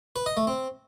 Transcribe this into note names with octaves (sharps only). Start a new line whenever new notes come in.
B4
D#5
A3
C4